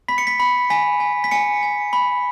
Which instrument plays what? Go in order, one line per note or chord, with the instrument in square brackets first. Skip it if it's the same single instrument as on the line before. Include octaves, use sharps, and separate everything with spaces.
[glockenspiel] B5 B6
C#7
B6
B5
G#5 B6
G#5
B6
G#5 C#7
G#5
B5